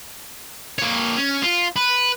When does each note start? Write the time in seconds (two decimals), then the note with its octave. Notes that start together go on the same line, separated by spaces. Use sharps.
0.79 A#3 C#5
1.17 C#4
1.42 F4
1.76 B4